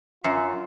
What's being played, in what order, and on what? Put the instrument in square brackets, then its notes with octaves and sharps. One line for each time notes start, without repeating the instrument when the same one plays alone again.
[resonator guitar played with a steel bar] F#2 [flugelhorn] F4